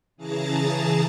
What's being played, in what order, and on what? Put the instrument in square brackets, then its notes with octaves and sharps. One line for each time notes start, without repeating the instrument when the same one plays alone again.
[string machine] C#3 E3 G#4 A5 A#5 A6